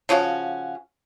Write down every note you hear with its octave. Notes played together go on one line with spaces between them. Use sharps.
C#3 F3 C#4 F#4